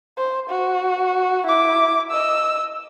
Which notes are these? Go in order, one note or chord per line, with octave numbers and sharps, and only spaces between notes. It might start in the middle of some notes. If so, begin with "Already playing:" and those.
C5
F#4
E4 D6
D#5 E6